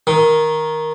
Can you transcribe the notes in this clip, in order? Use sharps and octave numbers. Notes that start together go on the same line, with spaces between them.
D#3